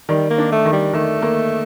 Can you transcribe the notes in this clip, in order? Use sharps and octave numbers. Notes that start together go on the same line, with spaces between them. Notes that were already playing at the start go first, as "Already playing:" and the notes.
D#3 G3
A#3
D4
A3
D#3
G3
D#3 A3
A#3